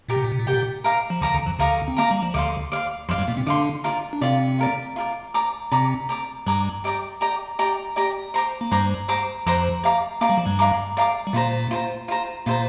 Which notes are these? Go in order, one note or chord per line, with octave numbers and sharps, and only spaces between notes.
A#2 G4 A#4 G5
C3
A#2
C3
A#2
C3 G4 A#4 G5
A#2
A#4 F5 A#5 D6
F3
D2 D3 A#4 F5 A#5 D6
D2 D3
F2 F3
D2 D3 A#4 F5 A#5 D6
C4
A#3 A#4 F5 A#5 D6
G3
F3
D2 D3 D5 F5 C6
D5 F5 C6
F2 F3 D5 F5 C6
G2 G3
A#2 A#3
C3 C4
D3 D4 D5 F5 C6
F4 A#4 D5
D4
C3 C4 F4 A#4 D5
F4 A#4 D5
F4 A#4 D5
D5 A#5 D6
C3 C4 D5 A#5 D6
D5 A#5 D6
G2 G3 D5 A#5 D6
G4 D5 A#5 D6
G4 D5 A#5 D6
G4 D5 A#5 D6
G4 D5 A#5 D6
C5 A#5 D6
A#3
G2 G3 C5 A#5 D6
C5 A#5 D6
F2 F3 C5 A#5 D6
D5 F5 A#5 D6
A#3 D5 F5 A#5 D6
G3
F3
G2 G3
D5 F5 A#5 D6
D5 F5 A#5 D6
G3
A#2 A#3 F4 C5 A#5
F4 C5 A#5
F4 C5 A#5
A#2 A#3 F4 C5 A#5